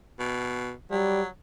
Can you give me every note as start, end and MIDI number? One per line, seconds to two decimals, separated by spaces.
0.19 0.72 47
0.91 1.28 54
0.91 1.22 55